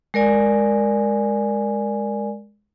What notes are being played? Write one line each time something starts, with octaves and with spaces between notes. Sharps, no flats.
G#3 A#4 D5 G#5